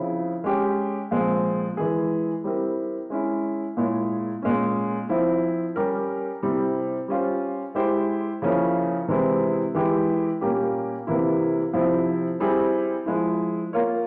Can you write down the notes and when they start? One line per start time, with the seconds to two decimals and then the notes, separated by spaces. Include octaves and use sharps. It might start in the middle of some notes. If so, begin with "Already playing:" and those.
Already playing: C#3 F3 C4 E4
0.44 G#3 C#4 G4
1.11 A#2 F3 G#3 C4
1.77 E3 G#3 E4 G#4
2.44 G3 C4 E4 A#4
3.10 G#3 C#4 E4
3.77 A#2 G#3 E4 G#4 C#5
4.42 A#2 G#3 C#4
5.09 F3 C4 E4
5.76 G3 C#4 G4 A#4
6.43 C3 G3 C4 E4
7.08 G3 C#4 F4 C5
7.75 G#3 E4 G4 C5
8.42 C#3 F3 A#3 C#4 E4
9.08 C3 E3 G#3 C4 E4
9.75 E3 G#3 E4 G4
10.41 A#2 G3 A#3 C#4 G4
11.07 C3 E3 A#3 E4
11.74 C3 F3 C4 E4
12.40 G3 C4 E4 G#4
13.06 F3 G#3 E4
13.73 A#3 F4 A#4 C#5